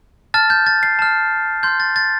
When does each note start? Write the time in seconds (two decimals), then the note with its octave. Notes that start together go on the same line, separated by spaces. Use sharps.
0.34 A5 F6 A6
0.50 G6
0.66 A6
0.83 C7
0.99 A5 F6
1.63 C6 F6 G6
1.80 A6
1.96 A6